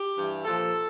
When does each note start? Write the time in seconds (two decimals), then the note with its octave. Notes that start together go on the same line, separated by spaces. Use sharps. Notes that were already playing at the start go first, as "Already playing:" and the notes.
Already playing: G4
0.16 G2 E3
0.44 A#2 F3 A4